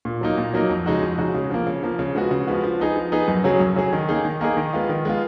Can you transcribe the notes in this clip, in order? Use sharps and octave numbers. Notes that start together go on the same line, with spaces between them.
A#2
F#3 A#3 D#4
A#2
F#3 A#3 D#4
F2
C#3 G#3 D#4 F#4
F2
C#3 G#3 D#4 F#4
C#3
F3 A#3
C#3
F3 A#3
C#3
F3 G#3 B3 F#4
C#3
F3 G#3 B3 F#4
F3
B3 D#4 G#4
F3
B3 D#4 G#4
F#2
C#3 F#3 C#4 G#4
F#2
C#3 F#3 C#4 G#4
D#3
A#3 D#4 G#4
D#3
A#3 D#4 G#4
D#3
G#3 B3 F4
D#3
G#3 B3 F4